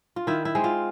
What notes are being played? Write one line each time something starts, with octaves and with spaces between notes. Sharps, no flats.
F4
D#3 E4
E4
G#3 C4
F4